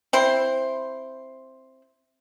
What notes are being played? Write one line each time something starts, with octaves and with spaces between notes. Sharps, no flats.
C4 E4 C5